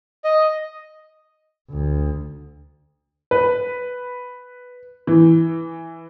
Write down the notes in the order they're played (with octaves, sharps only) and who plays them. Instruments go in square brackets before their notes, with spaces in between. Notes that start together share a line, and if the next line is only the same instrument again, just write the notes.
[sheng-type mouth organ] D#5
[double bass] D2
[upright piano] B4
E3